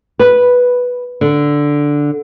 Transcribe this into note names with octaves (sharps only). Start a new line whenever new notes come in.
B4
D3